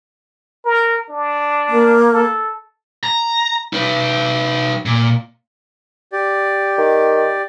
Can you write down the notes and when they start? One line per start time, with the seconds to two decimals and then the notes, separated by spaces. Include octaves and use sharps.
0.65 A#4
1.10 D4
1.69 A#3
2.13 A4
3.04 A#5
3.73 D#4 B4
4.86 A#2
6.12 G4 D5
6.78 D#3